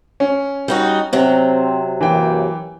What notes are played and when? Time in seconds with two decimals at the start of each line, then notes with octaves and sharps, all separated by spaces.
0.20 C#4
0.68 G3 D#4 F#4
1.13 C3 F#3 C4
2.01 F#2 E3 A#3 G4 G5